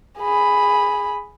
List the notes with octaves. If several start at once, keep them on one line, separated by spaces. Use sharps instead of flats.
G#4 B5